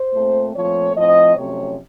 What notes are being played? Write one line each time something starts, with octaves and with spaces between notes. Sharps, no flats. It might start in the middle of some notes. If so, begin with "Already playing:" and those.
Already playing: C5
A#2 A3 C4
A#2 F3 A3 C4 C#5
A2 F3 C4 D#5
F2 C3 F#3 A3 C#4 C#5